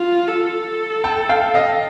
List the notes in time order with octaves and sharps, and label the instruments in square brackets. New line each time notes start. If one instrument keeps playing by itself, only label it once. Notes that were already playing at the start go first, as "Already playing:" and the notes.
Already playing: [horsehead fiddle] F4
A4
[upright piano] G5 A5
F5 G5
D#5 F5